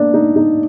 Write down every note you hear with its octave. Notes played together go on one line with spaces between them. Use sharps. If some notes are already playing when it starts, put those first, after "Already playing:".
Already playing: A#3 D4 D5
D#4
D#4